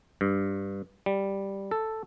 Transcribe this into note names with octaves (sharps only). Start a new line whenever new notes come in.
G2
G3
A4